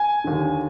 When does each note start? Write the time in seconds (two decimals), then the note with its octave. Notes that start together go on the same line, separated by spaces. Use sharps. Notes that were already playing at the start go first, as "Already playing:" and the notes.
Already playing: G#5
0.24 D#2 D3